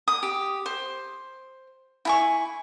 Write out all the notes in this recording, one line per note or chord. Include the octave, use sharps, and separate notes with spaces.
D#6
G4
C5
E4 G#5 C#6